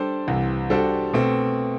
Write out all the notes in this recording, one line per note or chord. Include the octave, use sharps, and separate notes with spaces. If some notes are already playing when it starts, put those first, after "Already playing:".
Already playing: G3 D4 A4 C5
C2 C3 E3
G3 D4 F#4 A4 C5
B2 A3 C4